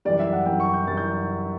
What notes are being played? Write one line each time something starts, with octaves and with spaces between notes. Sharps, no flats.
F#2 E3 G3 D5
E5
F#5
F#2 E3 G3 G5
C#6
G6
F#2 E3 G3 A6
G6